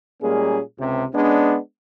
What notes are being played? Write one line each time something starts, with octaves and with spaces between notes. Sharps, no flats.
A#2 G3 G#3 A#3 C#4 G#4
C#2 C3
G#3 B3 C#4 D4